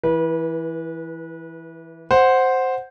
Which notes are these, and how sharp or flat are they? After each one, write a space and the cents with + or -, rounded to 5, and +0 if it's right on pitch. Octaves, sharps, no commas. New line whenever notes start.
E3 +0 B4 -30
C5 +0 F#5 -5